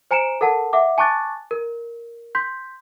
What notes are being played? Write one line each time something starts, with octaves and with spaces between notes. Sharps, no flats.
C5 G#5 A#5 C#7 D7 E7
A4 A#4 F#5 A5
E5 F#5 D6
G#5 A5 C#6 D6 F#6 A6
A#4
C6 G6 B6